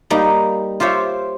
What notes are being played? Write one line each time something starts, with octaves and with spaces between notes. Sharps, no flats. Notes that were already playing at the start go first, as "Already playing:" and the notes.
G3 A#3 D#4
F4 G4 C5 C#5 E5